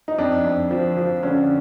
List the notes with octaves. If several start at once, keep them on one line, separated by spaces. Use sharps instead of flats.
D#4
F2 D4
F2
F3
F3
D3 C#4